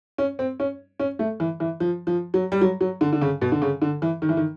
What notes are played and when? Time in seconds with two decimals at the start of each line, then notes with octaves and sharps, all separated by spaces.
0.18 C#4
0.39 C4
0.60 C#4
1.00 C#4
1.19 A3
1.40 E3
1.60 E3
1.80 F3
2.07 F3
2.34 F#3
2.52 G3
2.61 F#3
2.81 F#3
3.01 D3
3.13 D3
3.21 C#3
3.42 B2
3.52 D3
3.62 C#3
3.82 D3
4.02 E3
4.22 D#3
4.29 E3
4.37 D#3